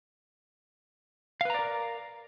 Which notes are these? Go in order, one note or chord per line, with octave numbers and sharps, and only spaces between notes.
A#4 B4 D5 F5 A#5